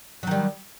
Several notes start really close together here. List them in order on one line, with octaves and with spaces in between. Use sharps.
F#3 D#3 G3